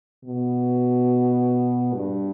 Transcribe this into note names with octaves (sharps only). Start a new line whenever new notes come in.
B2
G2